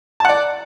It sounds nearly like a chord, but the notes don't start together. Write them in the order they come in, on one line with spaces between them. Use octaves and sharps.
A5 F#5 D5